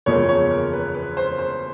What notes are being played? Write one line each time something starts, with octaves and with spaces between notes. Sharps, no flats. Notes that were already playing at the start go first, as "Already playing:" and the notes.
F#1 E2 C#3 F3 A#3 C#5
C#5
A#4
B4
B4
C5
C5